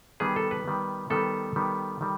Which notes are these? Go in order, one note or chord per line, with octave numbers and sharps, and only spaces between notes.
D#3 G3 B3 G#4
A4
B4
D#3 G3 B3
D#3 G3 B3 A4
D#3 G3 B3
D#3 G3